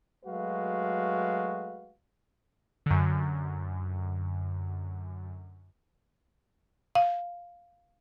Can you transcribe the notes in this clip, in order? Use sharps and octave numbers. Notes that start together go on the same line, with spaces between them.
F#3 G#3 A3 F#4 B4 F5
F#2 D3
F5